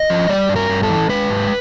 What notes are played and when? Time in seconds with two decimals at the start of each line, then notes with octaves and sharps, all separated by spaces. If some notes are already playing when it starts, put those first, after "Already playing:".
Already playing: D#5
0.10 F3
0.29 G3 D5
0.49 G2
0.56 A#4
0.70 G2
0.83 A4
0.89 E3
1.09 G#3 B4
1.30 G#2